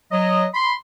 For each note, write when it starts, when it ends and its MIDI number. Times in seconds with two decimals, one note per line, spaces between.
0.12 0.45 54
0.12 0.45 75
0.54 0.72 83
0.54 0.72 84